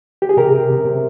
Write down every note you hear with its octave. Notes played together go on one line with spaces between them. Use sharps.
G4
G#4
C3 G4 A#4
C3
C3
C3